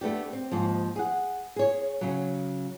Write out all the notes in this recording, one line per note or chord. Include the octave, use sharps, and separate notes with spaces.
A3 B3 D4 G4
C4
D#2 G#2 F3
G#4 F#5
G#4 C#5
C#3 F#3